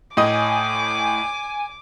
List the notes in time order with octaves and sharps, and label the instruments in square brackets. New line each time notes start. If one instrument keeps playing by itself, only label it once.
[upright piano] A2 D#5 D#6 [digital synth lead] G#5 [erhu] D6